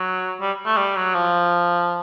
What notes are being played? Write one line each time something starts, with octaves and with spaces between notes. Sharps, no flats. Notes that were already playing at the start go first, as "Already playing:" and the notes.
Already playing: F#3
G3
A3
G3
F#3
F3